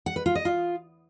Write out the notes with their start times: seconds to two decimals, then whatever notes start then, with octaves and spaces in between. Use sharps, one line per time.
0.06 F#5
0.16 B4
0.26 F4
0.35 D#5
0.45 F4